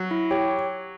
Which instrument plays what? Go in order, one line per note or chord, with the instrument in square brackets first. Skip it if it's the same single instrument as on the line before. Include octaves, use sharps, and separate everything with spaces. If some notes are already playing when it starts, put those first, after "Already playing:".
Already playing: [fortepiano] F#3
[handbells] E4
G4 C#5 G5